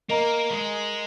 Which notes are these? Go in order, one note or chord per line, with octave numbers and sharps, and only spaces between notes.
A#3 A#4 D#5 A#5
G#3